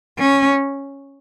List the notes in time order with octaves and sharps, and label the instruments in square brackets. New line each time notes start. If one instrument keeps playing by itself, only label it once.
[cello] C#4